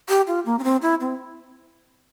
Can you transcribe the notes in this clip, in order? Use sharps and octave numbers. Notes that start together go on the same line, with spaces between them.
G4
F4
A#3
C#4
C4
E4
C4